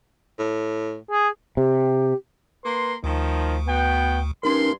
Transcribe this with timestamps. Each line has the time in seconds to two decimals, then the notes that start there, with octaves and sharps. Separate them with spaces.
0.39 A2
1.11 G#4
1.57 C3 G4
2.65 A#3 B4 C6
3.04 D2 D#3 F3
3.68 B2 B3 G5
4.43 G2 C#4 D#4 A#4 C6